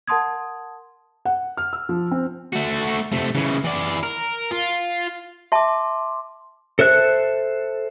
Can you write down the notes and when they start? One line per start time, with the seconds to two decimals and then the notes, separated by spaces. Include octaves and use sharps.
0.08 A#4 F#5 A5 C6 D#6 G#6
1.25 F#5
1.57 F6
1.73 E6
1.89 F3
2.11 C4
2.53 A3 F#4
3.12 C3 A3
3.35 C#3 E3
3.64 E3 D5
4.03 A#4
4.51 F4
5.52 E5 A5 C6 D6
6.79 A4 C5 E5 F#6